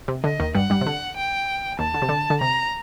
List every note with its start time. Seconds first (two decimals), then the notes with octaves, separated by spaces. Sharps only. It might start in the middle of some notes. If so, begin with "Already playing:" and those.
0.08 C3
0.23 D3 D#5
0.40 D#2 D#3
0.55 G2 G3 F#5
0.70 G2 G3
0.81 C3
0.86 D3
1.17 G5
1.79 D#2 D#3 A5
1.94 D3
2.02 C3
2.09 D3
2.30 D3
2.41 C3 A#5